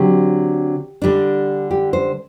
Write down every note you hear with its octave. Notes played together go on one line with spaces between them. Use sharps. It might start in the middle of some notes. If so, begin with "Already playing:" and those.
Already playing: D3 F#3 C4 G4
D3 G3 D4
G4
C5